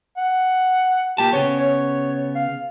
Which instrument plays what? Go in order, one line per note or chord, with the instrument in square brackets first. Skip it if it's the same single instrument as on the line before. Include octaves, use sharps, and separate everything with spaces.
[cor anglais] F#5
[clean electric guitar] A#2 A5 [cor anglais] G4
[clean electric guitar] C#3 B3 [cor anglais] C#5
[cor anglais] C#5
F5